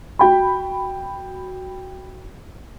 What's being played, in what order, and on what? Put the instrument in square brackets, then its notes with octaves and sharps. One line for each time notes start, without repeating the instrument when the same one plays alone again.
[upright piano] F#4 G5 B5